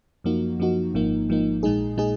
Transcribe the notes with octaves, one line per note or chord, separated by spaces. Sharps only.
F#2 F3 A#3 D#4 F#4
F#2 F3 A#3 D#4 F#4
G#1 G#2 F3 A#3 D#4
G#1 G#2 F3 A#3 D#4
A#1 A#2 G#3 D#4 G#4
A#2 G#3 D#4 G#4